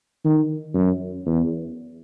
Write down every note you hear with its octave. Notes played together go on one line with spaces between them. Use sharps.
D#3
F#2
E2